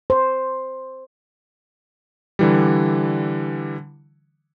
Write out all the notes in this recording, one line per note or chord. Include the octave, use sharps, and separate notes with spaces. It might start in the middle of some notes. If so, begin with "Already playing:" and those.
C5
D3 E3 G3